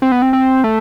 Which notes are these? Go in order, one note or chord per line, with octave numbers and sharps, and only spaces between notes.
C4
B3
C4
C4
A3